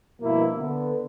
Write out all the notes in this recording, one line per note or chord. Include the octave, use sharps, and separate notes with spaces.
G2 B2 F3 A#3 E4
D3 B3